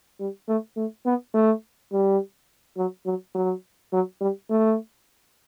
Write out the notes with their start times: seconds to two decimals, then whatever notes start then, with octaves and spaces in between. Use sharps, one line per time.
0.20 G3
0.48 A3
0.77 A3
1.05 B3
1.34 A3
1.92 G3
2.77 F#3
3.06 F#3
3.35 F#3
3.93 F#3
4.21 G3
4.50 A3